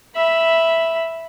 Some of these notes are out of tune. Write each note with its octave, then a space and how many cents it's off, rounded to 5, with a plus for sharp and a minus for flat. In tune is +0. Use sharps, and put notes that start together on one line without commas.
E5 +0 B5 +0